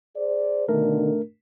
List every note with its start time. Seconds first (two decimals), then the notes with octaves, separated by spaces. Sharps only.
0.17 G#4 C5 D5
0.69 B2 D3 D#3 A3 D4 A#4